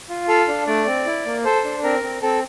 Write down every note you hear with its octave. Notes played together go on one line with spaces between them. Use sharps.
F4
A4 F5
D4
A3 D5
C4
E4
A#3
A4 C5
D4
C4 A#4
C4
C4 A4